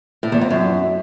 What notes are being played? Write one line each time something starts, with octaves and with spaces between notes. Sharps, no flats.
A2
E2
F2
F#2